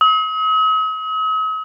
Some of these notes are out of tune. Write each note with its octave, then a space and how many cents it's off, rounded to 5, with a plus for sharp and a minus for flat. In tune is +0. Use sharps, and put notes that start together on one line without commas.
D#6 +45